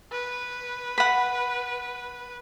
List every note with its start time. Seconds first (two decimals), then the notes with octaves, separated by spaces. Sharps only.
0.12 B4
0.98 F#5 B5